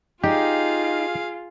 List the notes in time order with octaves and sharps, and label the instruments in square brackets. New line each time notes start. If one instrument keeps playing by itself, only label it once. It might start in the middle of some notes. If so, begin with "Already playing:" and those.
[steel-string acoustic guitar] D#4 [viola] F4 [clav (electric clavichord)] G4 [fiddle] G#4 F5